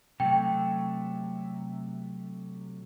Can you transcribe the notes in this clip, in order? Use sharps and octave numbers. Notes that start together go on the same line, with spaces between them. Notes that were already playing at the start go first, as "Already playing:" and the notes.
C3 F#3 A3 G5